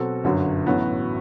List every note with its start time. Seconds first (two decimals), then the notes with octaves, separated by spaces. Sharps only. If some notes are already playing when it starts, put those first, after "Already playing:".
Already playing: B2 F#3 C4 F#4 A4
0.24 G1 F#2 D3 F#3
0.66 A1 A2 F#3 B3 F#4